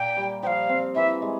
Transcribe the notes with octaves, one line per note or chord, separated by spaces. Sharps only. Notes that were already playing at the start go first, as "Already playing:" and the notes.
Already playing: A#2 A#3 G5
G3
F3 F5 G5
C4
E3 E5
G#3